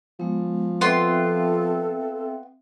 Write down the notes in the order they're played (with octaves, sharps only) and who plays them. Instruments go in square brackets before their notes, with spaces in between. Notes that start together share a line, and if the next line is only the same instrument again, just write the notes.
[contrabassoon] F3 [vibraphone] G#3 B3
[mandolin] B3 F4 C6 [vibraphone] C4 E5 G5 [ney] A4